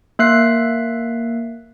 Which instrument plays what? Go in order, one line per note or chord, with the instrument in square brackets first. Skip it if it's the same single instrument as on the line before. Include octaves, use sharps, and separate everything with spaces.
[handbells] A#3 E5 F#6 C7